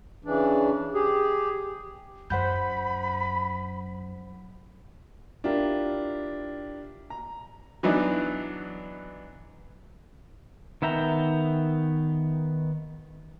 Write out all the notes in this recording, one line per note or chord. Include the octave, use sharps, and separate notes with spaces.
C#3 E3 D4
G4 G#4
F#2 C5 F#5 B5 G6
D4 E4 F4 G4 A#4
A#5
E3 F#3 B3 D4 D#4
D#3 B3 E5 G5 A#5